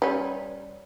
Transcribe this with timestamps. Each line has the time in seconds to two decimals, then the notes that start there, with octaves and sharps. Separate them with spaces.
0.02 G3 C#4